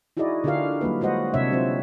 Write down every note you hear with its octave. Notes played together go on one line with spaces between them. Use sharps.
D#4 E4 F#4 G#4 D5 D#5
D3 D4 F4 G4 A#4 F5
F#3 G3 A#3 B4
G#3 F#4 C5 D#5 F#5
C3 D4 C#5 E5
F#3 C4 F4 C5